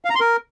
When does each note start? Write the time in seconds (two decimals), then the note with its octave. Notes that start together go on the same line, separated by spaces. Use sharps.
0.05 F5
0.10 A#5
0.15 C6
0.20 A#4